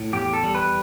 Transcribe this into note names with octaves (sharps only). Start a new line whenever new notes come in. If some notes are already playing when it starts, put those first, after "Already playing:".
Already playing: A2
E2 G4
A4
G3
B4